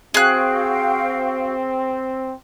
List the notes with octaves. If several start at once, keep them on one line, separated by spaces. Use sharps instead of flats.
C4 F#4 G#4 F5 G5 F#6